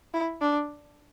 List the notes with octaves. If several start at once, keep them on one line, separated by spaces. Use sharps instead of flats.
E4
D4